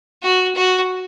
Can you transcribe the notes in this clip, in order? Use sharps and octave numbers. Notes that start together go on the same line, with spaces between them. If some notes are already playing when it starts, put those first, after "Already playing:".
F#4
F#4